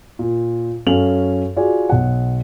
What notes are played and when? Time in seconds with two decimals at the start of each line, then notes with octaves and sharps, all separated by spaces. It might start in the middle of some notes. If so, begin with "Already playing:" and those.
0.19 A#2
0.87 F#2 C#4 A4 F5 F7 F#7
1.57 F4 F#4 G#4 D5 G#5
1.90 B1 F#5